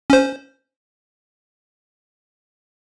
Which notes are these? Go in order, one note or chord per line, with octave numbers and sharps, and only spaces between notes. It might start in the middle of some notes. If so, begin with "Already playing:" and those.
C#4 C5